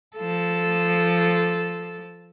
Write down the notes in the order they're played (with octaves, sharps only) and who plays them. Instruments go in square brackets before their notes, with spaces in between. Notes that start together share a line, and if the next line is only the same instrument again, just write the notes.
[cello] F3 A4